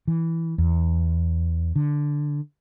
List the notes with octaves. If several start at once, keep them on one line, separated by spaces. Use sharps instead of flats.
E3
E2
D3